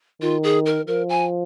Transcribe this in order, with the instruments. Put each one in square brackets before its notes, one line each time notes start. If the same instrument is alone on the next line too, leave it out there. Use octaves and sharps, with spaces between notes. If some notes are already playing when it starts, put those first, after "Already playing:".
[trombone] D#3 [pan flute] F4
[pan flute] G#4
A#4
[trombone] F3 [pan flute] A#4
[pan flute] G#5